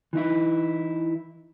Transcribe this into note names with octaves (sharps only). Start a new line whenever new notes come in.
E3 D#4 E4